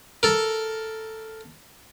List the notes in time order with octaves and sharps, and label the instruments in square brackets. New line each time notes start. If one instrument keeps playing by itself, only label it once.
[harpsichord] A4 A#4